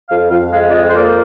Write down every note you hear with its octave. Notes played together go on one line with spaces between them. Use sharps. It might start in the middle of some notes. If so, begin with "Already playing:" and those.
F2 F5
F2 F5
G#3 F5
D5
F2 D#5
C5
A#3 D5